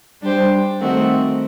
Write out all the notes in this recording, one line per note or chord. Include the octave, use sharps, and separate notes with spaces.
G3 D4 G4 C5
D#3 A3 C4 F#4 A#4